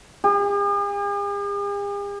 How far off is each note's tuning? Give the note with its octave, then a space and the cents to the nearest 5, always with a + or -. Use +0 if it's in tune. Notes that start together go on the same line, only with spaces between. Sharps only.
G#4 -45